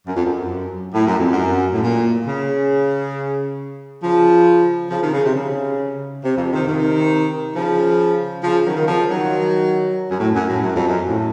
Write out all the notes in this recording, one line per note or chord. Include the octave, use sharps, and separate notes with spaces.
F#2
F2
F#2
A2
F#2
F2
F#2
A2
A#2
C#3
C#3 F3
C#3 F3
C3 D#3
C#3
C3
C#3
C3
F2
C3 D#3
C3 D#3
C#3 F3
C#3 F3
D#3 F#3
D#3
C#3 F3
D#3 F#3
F#2
A2
F#2
A2
F#2
F2
F#2
A2